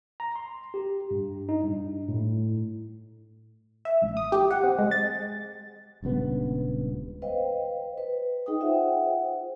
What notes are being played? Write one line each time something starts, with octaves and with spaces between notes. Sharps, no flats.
A#5
C6
G4
G2
D#4
G2
A2
E5
A1
D#6
G4
F#5
C4
G#3
A6
D#1 C#2 G2 B3
B4 C5 D#5 F5 G5
B4
D#4 G#4 D#5 G5 D#6
F4 C5 E5 F#5 G5